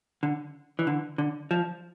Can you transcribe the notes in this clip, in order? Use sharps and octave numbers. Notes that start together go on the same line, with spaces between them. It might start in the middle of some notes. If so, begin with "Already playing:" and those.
D3
E3
D3
D3
F3